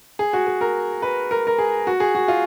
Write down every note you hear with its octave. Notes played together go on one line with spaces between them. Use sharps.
G#4
F#4
G#4
A#4
B4
A#4
A#4
G#4
F#4
G#4
F#4
F4